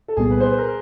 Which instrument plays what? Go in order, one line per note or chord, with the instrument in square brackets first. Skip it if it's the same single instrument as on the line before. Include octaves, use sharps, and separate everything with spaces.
[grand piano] A4
[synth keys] C2 A#2 G3 B3 [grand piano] G#4
[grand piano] B4
C5
B4
A#4